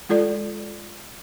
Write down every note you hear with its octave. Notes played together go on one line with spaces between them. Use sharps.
G#3 F4 A4 D5